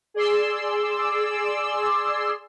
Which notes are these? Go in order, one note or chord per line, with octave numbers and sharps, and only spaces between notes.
G#4 D5 C6 E6